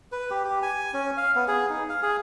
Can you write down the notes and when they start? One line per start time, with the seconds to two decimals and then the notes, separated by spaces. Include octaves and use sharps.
0.12 B4
0.30 G4
0.44 G4
0.62 G#5
0.94 C#4
1.17 F5
1.35 B3
1.48 G#4
1.70 D#4
1.89 F5
2.02 G#4